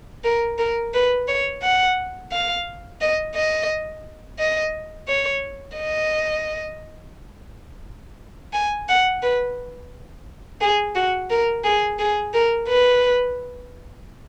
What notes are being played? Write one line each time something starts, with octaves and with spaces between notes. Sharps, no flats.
A#4
A#4
B4
C#5
F#5
F5
D#5
D#5
D#5
C#5
D#5
G#5
F#5
B4
G#4
F#4
A#4
G#4
G#4
A#4
B4